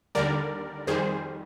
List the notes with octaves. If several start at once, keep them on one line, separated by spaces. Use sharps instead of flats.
D#2 D3 G3 A#4 D5
F2 D#3 G3 G#4 C5